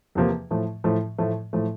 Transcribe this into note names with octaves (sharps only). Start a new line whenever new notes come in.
E2 C3 F3 A#3
A2 F3 A3
A2 F3 A3
A2 F3 A3
A2 F3 A3